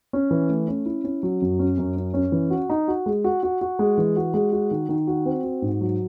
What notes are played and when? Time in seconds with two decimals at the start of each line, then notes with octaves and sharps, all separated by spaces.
0.13 C#4
0.31 E3
0.49 A3
0.68 C#4
0.86 E4
1.04 C#4
1.23 F#3
1.41 F#2
1.59 C#4
1.78 F#2
1.97 C#4
2.14 C#4
2.32 E3
2.50 F#4
2.70 D#4
2.88 F#4
3.06 G#3
3.24 F#4
3.43 F#4
3.61 F#4
3.79 G#3
3.98 E3
4.16 F#4
4.34 G#3
4.53 F#4
4.71 D#3
4.89 D#3
5.07 F#4
5.25 C4
5.44 F#4
5.62 G#2
5.81 F#3